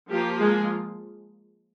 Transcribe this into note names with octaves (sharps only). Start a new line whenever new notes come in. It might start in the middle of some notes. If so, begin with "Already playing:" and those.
F3 A#3 F4 G4
G#3 G#4